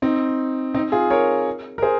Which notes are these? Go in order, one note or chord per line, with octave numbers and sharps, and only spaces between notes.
C4 D#4
C4 D#4
F4 G#4
A#4 C#5
A#4
G#4 C5